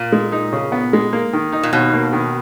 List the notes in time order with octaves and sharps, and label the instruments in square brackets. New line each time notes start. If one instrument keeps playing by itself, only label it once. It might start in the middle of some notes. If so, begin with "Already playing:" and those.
Already playing: [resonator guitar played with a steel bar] A#2
[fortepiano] G#3
D#4
C#3
B3
G#3
A#3
D#3
D#4
[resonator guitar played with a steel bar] A#2
[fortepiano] D#2 [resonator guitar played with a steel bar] B2
[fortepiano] A#3
D#3